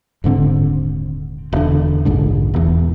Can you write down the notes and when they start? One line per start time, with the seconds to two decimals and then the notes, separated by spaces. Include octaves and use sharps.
0.24 D#1 G#2 D3 C4
1.53 E1 D3
2.05 F1 A#1 G#2 D3
2.54 E1 E2